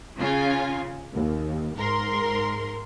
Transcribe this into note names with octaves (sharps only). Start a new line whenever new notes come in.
C#3 F4 G#5
D#2
G#2 A#4 C6